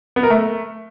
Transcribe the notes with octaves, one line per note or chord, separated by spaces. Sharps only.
B3
A#4
A3